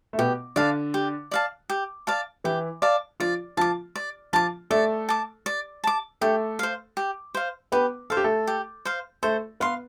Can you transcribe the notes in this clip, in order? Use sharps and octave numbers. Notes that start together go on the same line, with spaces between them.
A3
B2 B3 G4
D3 D4 D5 F5 A5
G4
D5 F5 A5
G4
D5 F5 A5
E3 E4 G4
D5 F5 A5
F3 F4 D5
F3 F4 A5 D6
D5
F3 F4 A5 D6
A3 A4 D5
A5 D6
D5
A5 D6
A3 G4 A4
C5 F5
G4
C5 F5
B3 G4 B4
A4 C5 F5
G4
A3 A4
G4
C5 F5
A3 A4 C5
B3 B4 F5 C6